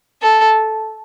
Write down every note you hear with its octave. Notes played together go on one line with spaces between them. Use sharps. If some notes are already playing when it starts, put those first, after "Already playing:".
A4